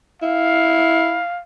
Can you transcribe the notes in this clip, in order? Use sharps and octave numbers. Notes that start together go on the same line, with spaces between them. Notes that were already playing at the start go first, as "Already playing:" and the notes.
E4 F5